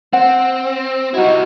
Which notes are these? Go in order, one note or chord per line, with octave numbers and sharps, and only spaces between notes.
C4 F#5
G3 D#4 E4 F#4